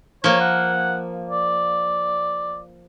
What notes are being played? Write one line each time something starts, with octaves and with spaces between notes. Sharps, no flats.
F3 A#3 C#5
F#5
D5